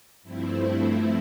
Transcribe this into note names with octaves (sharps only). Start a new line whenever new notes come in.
G2 F3 A3 C4 E4